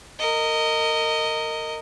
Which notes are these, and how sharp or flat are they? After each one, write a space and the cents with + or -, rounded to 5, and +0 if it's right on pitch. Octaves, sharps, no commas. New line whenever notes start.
A#4 -25 D#5 +0